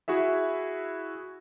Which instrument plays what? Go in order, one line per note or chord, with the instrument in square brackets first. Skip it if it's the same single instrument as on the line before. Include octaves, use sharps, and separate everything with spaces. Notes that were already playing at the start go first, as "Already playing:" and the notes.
[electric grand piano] E4 F#4 G#4 E5